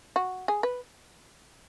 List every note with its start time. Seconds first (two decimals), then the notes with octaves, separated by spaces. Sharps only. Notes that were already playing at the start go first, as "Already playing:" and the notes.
0.16 F#4
0.48 G#4
0.63 B4